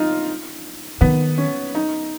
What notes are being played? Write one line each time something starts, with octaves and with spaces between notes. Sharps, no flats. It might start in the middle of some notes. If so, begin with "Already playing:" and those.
Already playing: D#4 F4
D#3 B3
C#4
D#4